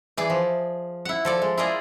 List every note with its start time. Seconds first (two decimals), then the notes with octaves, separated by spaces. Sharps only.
0.17 E3 G#4 D5
0.30 F3
1.05 E4 F#5
1.25 F3 A4 D5
1.42 G#3
1.57 E4 F4 G#4 A#4 D5 D#5